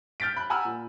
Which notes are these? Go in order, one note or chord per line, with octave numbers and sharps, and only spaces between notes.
F6 G6 A6 B6 D7
B5 F#6
F#5 G#5 A#5 B5 E6 F6
A#2